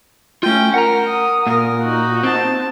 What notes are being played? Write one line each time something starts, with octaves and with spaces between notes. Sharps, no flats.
A3 C#4 F4 G5
A#4 F#5 A#5
D#6
A#2 A#4
D#4 F#4
C4 A5